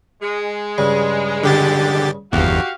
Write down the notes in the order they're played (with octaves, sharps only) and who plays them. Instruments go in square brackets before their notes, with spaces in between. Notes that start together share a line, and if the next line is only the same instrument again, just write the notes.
[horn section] G#3
[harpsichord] G2 C#3
[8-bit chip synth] D3 G4 A6
[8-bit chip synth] G1 E2 [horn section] F#4 G4 F5